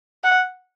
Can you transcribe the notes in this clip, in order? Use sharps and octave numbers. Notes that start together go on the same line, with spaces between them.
F#5